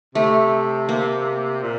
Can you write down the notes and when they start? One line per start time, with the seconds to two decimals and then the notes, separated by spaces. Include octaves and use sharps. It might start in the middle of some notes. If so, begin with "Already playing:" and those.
0.15 C3 A3
0.89 A#3
1.63 A#2